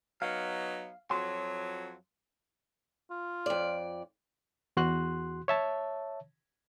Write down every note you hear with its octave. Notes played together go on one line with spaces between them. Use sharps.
F#3 B3 D#4 F5
F2 F#3 C6
F4
F2 D5
E2 F#4 C6 F#6
C#5 E5 A5